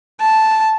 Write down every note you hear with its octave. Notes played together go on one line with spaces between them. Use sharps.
A5